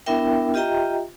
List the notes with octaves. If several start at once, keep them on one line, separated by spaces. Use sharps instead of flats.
B3 D4 E4 A#4 E5 G5
F4 G4 D#5 E5 G5 A#5